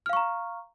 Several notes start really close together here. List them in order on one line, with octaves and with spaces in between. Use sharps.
F6 F5 C#6 A#5